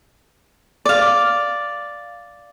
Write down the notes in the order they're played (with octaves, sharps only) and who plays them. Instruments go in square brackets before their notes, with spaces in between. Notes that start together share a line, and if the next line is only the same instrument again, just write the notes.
[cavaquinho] D5 F5